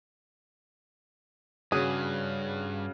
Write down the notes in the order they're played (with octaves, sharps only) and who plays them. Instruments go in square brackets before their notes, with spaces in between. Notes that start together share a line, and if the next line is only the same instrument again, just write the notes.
[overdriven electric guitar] G2 [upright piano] C#3 F#4 [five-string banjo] G#4